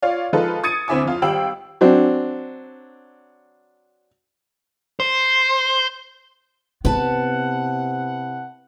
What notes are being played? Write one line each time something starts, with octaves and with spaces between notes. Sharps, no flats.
F4 C#5 D5 F5
F3 G#3 D#4 F4 A4 B4
D#6 G#6 A6 C#7 D#7
D2 C4 E4 E5 G#5 D6
F2 F4 F5
G#1 G3 F5 G5 E6 F#7
F#3 C4 D4
C5
C3 B3 E4 B4 F#5 A5